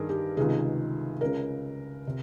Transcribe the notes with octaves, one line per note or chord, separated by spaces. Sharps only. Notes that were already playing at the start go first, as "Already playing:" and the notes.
Already playing: G2 D#3 G#4 A#4
G4
C#2 C3 D#3 G#4
C#2 C#3 A#4
C3